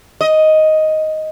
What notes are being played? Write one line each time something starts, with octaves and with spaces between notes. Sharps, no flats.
D#5